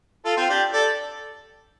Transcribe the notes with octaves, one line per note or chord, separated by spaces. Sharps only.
F4 A4
C4 F4
D4 G4
A4 D5